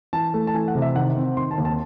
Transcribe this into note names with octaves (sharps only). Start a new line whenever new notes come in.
E3 A5
A3
A5
E3 G#5
F#5
C3
E5
D#3 F#5
C4
D#3 C6
A5
D#2
A5